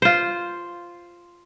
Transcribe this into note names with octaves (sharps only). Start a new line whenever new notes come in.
F4 C5